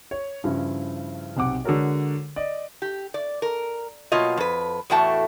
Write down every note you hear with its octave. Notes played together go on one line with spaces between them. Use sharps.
C#5
G2 C#3 F3 E4
B1 C3 F#5 D6
D3 G#3 F#4 A4 A#4 C#5
D5 D#5
G4
D5
A#4
B2 F#3 A#3 F4 C#5 D#5
F2 B4
E2 A2 A3 F#4 G5 A5